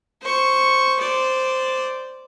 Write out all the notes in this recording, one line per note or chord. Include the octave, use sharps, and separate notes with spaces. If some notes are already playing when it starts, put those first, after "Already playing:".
C5 C#6
C5 D5